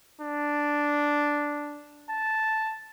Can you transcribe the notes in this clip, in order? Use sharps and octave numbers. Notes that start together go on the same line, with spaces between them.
D4
A5